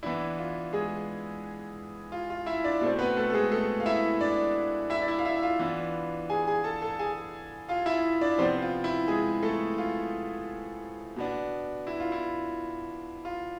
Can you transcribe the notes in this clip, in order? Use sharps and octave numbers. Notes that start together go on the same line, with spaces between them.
E3 B3 D4 E4
F4
G#3 G#4
F4
F4
E4 E5
D4 D5
B2 A3 C4
B3 B4
A3 A4
A4
G#3 G#4
A3 A4
F5
E4 E5
D4 D5
E4 E5
D5
E4 E5
F5
E4 E5
E5
F4 F5
E3 B3 D4
G#4 G#5
G#4 G#5
A4 A5
A4 A5
G#4 G#5
F4 F5
E4 E5
D4 D5
C3 F3 B3 C4 C5
F4
E4
G#3 G#4
A3 A4
F4
B2 B3 D4
E4
F4
E4
F4